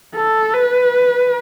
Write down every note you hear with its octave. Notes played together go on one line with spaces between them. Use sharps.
A4
B4